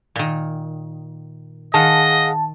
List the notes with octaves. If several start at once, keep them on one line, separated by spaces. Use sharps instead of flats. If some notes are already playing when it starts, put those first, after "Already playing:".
A#2 D#3
D#3 G#4 D#5 F5 F#5 A5